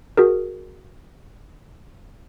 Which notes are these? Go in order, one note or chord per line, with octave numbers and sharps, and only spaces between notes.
F#4 G#4 A#4